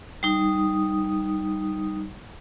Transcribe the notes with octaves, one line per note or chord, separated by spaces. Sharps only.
G3 D#4 D#6